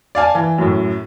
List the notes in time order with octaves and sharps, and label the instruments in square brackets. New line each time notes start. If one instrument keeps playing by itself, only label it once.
[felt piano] D5 F5 G#5 A5
E3
F#2 A2